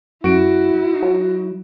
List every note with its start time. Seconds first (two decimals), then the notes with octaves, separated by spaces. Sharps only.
0.24 F#2 E4 F#4 D7
1.02 F#3